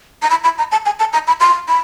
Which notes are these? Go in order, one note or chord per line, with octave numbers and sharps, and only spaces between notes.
A#5
B5
B5
A#5
A5
G#5
A5
A#5
B5
C6
B5